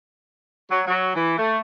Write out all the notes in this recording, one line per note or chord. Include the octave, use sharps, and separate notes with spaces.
F#3
F#3
E3
A3